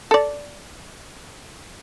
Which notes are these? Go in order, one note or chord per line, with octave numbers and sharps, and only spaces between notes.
A4 D5